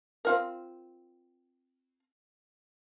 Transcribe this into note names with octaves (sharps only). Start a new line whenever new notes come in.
C4 F4 A#4